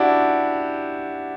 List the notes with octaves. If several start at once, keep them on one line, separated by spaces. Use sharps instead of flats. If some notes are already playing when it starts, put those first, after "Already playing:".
Already playing: D4 E4 F#4 G4